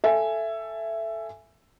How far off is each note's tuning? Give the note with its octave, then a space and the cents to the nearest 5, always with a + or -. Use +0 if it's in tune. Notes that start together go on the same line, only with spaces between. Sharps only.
A4 +0 E5 +15 G#5 +0